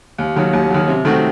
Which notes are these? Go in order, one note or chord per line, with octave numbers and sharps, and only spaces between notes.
D#2
D#3 F#3
D#2
D#3 F#3
C3
D#3 A3 C4 F#4